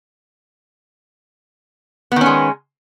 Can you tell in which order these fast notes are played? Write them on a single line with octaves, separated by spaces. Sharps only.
B3 D#3 C#4 G#3